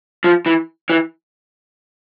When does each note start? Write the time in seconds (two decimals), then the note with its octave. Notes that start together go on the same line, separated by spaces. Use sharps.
0.24 F3
0.46 E3
0.90 E3